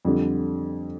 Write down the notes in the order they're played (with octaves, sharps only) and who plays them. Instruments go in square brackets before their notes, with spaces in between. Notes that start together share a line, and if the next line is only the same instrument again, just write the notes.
[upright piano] F2 D3 G3